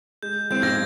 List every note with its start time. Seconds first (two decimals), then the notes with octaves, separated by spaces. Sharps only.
0.22 G#3 G6
0.51 E3 G#3 B3 C4 G6
0.62 G#1 F3 F6 G#6 A#6